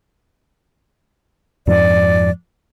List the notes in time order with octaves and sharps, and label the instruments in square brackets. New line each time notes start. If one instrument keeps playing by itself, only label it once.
[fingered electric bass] F2 G#2 F3 [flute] D5